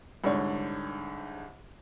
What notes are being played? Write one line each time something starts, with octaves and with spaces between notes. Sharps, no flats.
C2 G#2 D3 C#5